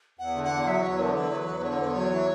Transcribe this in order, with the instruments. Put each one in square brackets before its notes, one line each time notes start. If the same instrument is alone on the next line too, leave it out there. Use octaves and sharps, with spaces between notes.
[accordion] E2 [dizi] F#5
[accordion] D3
[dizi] F#5
[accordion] E2
[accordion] F#3 [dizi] E5
[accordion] E2 [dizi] C#5
[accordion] D3 [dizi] A#4
[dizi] C#5
[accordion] E2 [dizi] B4
[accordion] F#3
E2
[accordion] D3 [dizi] C#5
[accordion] E2 [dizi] B4
[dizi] C#5
[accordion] F#3
E3